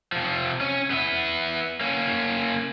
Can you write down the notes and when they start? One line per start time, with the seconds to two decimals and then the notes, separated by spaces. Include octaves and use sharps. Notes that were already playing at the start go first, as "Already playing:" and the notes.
0.12 C3 F3
0.61 C#4
0.91 B3 E5
1.81 A#3 C#4